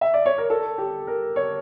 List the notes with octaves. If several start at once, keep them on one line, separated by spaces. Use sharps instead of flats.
E5
D5
C#5
A#4
A4
G4
A#4
C#5